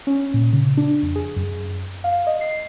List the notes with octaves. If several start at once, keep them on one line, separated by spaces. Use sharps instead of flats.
C#4
A#2
C#3
D4
F2
G#4
F#2
F5
D#5
C7